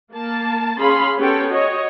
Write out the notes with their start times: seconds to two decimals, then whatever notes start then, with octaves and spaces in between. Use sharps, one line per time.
0.13 A#3 A5
0.78 C#4 G#4 F5 B5 C6
1.17 B3 C#4 G4 A4 G5
1.50 F#4 C#5 D#5